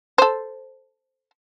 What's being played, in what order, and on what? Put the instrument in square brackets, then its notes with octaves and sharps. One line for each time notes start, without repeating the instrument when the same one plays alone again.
[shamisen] A4 C5